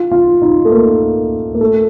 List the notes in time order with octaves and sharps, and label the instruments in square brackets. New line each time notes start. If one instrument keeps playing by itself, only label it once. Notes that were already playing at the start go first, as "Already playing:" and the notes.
Already playing: [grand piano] F4
F4
D#4
A3
A#3
A#3
A3